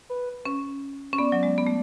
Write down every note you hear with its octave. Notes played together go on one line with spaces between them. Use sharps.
B4
C#4
C#4
B3 D5
F#3
G#3
B3
A3